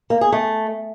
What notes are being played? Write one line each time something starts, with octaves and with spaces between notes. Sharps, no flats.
A#3
G#4
A3